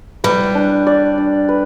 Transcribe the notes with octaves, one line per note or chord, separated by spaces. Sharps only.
G3 B4
D4
D5
D4
B4